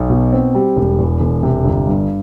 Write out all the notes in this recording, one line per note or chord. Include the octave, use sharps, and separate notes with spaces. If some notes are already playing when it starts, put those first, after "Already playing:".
Already playing: B1
B2
C4
G3
E1
E2
E1
C3
G1
G2